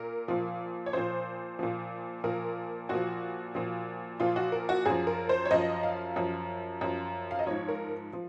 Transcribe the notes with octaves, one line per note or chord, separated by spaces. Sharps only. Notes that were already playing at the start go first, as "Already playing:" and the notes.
Already playing: A#2 A#4
A#2 F3
C#5
A#2 F3 C5
A#2 F3
A#2 F3 A#4
A#2 F3 F#4
A#2 F3
A#2 F3 F4
F#4
A#4
F#4
F#2 F3 G#4
A#4
C5
C#5
F#2 F3 D#5
F5
F#2 F3
F#2 F3
F5
D#5
G#2 F3 C#5
A#4
F3